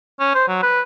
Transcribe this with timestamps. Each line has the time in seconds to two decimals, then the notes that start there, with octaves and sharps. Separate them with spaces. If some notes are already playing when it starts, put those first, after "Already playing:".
0.20 C#4
0.35 C5
0.49 F#3
0.63 B4